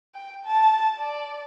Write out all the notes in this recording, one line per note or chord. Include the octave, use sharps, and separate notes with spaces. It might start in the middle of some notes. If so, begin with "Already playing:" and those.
G5
A5
D5